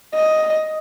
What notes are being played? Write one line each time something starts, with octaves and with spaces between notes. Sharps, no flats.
D#5